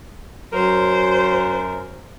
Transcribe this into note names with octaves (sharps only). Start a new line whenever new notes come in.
F#2 F#3 A#4 C5